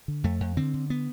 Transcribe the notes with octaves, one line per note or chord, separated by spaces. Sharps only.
D3
F2 A3
F2
D3 C4
D3
B3